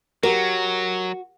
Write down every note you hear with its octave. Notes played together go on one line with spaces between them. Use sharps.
F#3 F#4 G4 A#4